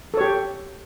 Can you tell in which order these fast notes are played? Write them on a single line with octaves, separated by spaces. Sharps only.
A4 C#5 G4